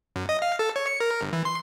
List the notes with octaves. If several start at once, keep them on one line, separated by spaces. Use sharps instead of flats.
F#2
D#5
F5
A4
C#5
C#7
A#4
G1
E3
C6